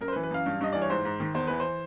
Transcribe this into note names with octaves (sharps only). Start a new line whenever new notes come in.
F#2 A#4
C5
B4
E3
B4
F#2 F5
G2
G2 D#5
E3 D5
C#5
G#2 C5
G#2
D#3
E2 C5
E3 B4
C5